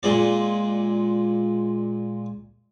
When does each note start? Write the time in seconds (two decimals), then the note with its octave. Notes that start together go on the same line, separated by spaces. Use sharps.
0.03 A#2 G#3 D5